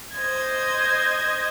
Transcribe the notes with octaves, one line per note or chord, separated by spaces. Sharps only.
C5 D#5 G#6